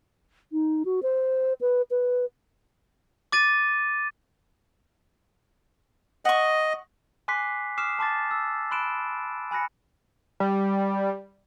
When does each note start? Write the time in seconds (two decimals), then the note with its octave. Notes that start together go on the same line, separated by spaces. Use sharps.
0.52 D#4
0.85 F#4
1.03 C5
1.61 B4
1.91 B4
3.32 D6 A6 D#7
6.25 D#5 F#5 C#6
7.28 G#5 C6 D6 F#6 B6 C7
7.77 D6 D#6 F6 C7 E7
7.99 A5 C6 D6 A6
8.31 E6
8.71 B5 C6 F#6 D7 E7
9.51 G#5 B5 F#6 A#6 C#7
10.40 G3